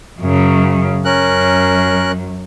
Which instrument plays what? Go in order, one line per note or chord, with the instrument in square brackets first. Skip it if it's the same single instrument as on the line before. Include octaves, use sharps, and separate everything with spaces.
[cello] F#2 C#3
[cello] F#2 [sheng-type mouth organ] C#4 A#4 F#6